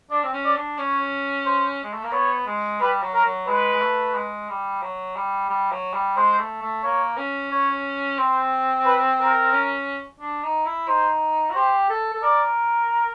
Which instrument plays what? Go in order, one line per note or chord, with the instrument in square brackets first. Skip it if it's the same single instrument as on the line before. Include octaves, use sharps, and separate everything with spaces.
[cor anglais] D4 [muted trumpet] D5
[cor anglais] C4
C#4
[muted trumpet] D5
[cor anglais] D4
[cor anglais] C#4 [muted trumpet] C#5
[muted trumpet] C5
[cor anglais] G#3
A3
A#3
[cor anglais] B3 [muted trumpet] C#5
[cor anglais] G#3
[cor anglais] G3 [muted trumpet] B4
[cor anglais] F#3
[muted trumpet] A#4
[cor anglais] F#3
[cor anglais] G#3 [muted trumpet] B4
[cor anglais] G#3
A3
G#3
G3
F#3
G3
G3
F#3
G3
[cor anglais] G#3 [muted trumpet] C5
[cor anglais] A3
A3
[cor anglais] A#3 [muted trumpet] C#5
[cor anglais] C#4
[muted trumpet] C#5
[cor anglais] C4 [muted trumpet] C5
[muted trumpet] B4
A#4
[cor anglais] C#4
D4
D#4
E4
[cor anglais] D#4 [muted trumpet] C5
[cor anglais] F#4
[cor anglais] G4 [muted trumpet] C5
[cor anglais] A4
A4
[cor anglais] A#4 [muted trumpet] D5